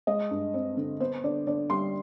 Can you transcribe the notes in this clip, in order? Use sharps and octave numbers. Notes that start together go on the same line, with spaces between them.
G#3 D#5
G2
C4
D3
B3 C5
D3 D5
D3 D5
G3 C6